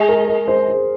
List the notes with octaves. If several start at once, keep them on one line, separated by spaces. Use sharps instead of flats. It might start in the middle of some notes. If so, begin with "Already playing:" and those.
Already playing: G#3 G#4
A#4
A#4
C5
C5